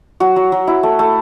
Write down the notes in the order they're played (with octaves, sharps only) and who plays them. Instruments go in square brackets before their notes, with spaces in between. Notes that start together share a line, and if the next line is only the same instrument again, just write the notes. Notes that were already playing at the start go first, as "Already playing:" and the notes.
[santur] F#3 F#4
F#3
F#3
E4
A3
A3